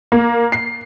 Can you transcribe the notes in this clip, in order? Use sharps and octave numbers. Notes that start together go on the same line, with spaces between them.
A#3
C7